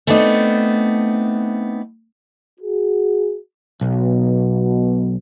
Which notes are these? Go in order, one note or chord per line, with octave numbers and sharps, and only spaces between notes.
A3 B3 C4 D4 D#4
F#4 G#4
B1 B2